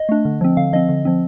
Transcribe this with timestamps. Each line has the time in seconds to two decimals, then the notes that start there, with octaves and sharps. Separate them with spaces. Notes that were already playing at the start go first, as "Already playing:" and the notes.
Already playing: D#5
0.09 A3 D4
0.25 D3
0.41 F3 C4
0.57 D3 F5
0.73 F3 C4 D#5
0.89 D3
1.05 F3 C4